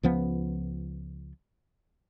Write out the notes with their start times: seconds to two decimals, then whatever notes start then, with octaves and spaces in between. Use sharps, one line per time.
0.03 C#2 F3 B3